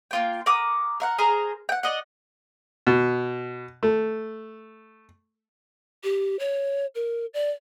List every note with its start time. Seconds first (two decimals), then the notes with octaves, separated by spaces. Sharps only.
0.11 A#3 F4 G5
0.46 A#4 F#5 D6 D#6
1.00 A#4 F5 F#5
1.18 G#4 A#4 C5 A#5
1.69 F#5 G5
1.83 D5 D#5 F#5
2.87 B2
3.83 A3
6.04 G4
6.39 C#5
6.95 A#4
7.34 D5